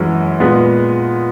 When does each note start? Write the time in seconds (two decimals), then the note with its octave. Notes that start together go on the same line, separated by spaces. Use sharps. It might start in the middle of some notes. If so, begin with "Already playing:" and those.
Already playing: F#2 E3 G#3 C#4
0.40 A#2 G#3 B3